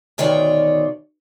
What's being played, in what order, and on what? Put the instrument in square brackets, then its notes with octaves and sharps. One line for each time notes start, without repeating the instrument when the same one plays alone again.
[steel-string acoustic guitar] D2 B2 D#3 F4 C#5 D5